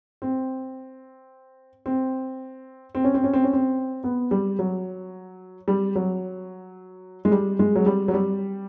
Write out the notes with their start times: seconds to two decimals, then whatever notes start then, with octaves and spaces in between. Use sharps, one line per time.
0.22 C4
1.86 C4
2.95 C4
3.04 C#4
3.14 C4
3.24 C#4
3.33 C4
3.44 C#4
3.53 C4
4.04 B3
4.31 G3
4.59 F#3
5.68 G3
5.96 F#3
7.25 G#3
7.32 G3
7.59 G#3
7.75 F#3
7.86 G3
8.08 F#3
8.14 G3